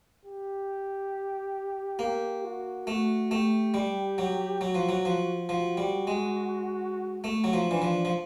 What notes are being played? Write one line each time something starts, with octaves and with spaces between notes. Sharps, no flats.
G4
A#3 G4
F#4
A3 F#4
A3 G4
G3
F#3
F#3 F#4
F3
F#3
F3
F3 F#4
G3
G#3
A3
F#3
F3
E3 D4
F3
F3